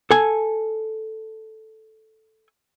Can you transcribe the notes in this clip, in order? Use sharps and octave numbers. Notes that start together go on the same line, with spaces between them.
A4 G#5